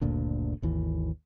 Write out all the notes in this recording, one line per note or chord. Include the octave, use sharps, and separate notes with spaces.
F#1 D2 A#2 D3
G#1 D#2 E3